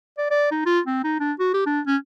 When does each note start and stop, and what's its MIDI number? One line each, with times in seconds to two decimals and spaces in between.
0.18 0.29 74
0.30 0.48 74
0.51 0.66 63
0.66 0.80 65
0.86 1.03 60
1.04 1.19 63
1.20 1.33 62
1.39 1.50 66
1.54 1.64 67
1.66 1.80 62
1.87 1.97 61